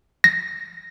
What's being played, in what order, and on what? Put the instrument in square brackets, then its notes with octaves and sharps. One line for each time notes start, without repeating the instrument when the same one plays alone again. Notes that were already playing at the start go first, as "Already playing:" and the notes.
[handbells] A#6